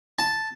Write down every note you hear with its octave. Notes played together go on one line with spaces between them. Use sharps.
A5